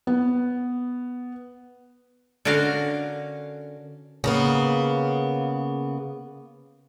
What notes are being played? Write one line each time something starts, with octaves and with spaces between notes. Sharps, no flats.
B3
D3 C#4 F#4 A#4 F5 F#5
C#3 A#3 B3